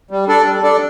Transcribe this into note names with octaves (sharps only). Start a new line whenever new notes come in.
G3
D4 A4 D5
G3
D4 A4 D5